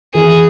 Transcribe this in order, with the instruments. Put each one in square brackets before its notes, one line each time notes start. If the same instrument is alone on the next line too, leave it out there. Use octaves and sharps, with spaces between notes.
[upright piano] E3 [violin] G#4